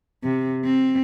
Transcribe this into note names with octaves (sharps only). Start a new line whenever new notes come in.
C3
C4